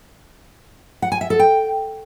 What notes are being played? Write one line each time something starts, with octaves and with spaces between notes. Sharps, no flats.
F#5
G#5
E5
A4
G5